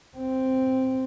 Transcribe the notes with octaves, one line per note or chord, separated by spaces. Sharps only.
C4